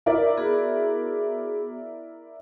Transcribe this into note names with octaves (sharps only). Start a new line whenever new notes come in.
E4 A#4 D5
B3 F#4 G#4